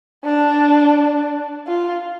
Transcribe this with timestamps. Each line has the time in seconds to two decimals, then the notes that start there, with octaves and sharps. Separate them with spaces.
0.25 D4
1.67 F4